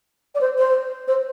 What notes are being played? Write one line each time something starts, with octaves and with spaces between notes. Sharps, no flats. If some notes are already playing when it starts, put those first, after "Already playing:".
D5
C5
C5
C5